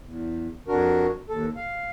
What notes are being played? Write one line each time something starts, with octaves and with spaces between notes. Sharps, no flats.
E2
F2 D4 F#4 A#4
D#2 A4
F5